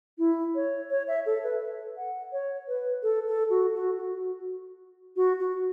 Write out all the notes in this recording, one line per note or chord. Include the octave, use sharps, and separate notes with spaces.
E4
C#5
C#5
E5
A4
B4
F#5
C#5
B4
A4
A4
F#4
F#4
F#4
F#4
F#4